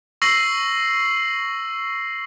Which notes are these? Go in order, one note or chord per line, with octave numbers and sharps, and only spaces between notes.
C#6 E6 A#6 C7 F#7